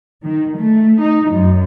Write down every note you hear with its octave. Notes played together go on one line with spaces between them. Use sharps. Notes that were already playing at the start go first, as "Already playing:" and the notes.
D#3
A3
D#4
F#2